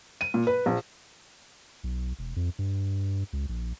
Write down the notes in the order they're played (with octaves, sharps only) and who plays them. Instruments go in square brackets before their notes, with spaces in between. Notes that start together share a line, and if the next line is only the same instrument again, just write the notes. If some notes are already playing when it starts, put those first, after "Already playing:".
[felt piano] D#7
A#2
B4
A#1
[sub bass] B1
E1
F2
G2
C#2
A#1